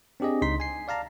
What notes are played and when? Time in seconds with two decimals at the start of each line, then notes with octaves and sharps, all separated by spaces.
0.20 C4 D4 G4 G#4 D#5
0.42 C#2 D#4 C6 B6
0.58 D#5 G#5 C7
0.88 D5 F5 A5 A#5